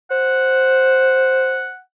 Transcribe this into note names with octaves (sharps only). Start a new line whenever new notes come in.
C5 F#5